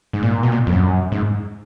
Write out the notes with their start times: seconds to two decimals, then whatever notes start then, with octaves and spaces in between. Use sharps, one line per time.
0.13 G#2
0.23 A#2
0.43 B2
0.52 A#2
0.67 F2
0.72 F#2
1.12 G#2